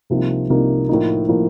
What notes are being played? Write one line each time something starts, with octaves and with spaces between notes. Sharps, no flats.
C2 C3 F3 A#3 D#4
C2 C3 F3 A#3 D#4
A2 F3 A#3 D#4
A2 F3 A#3 D#4